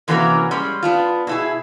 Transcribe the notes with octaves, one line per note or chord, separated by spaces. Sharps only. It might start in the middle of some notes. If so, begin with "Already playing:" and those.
C3 E3 A#3 C#4 F#4 A#4
G3 G#3 C#4
B3 D4 F4
B2 E4 G#4